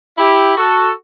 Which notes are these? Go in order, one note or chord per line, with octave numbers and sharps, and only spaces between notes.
E4 G4
F#4 A4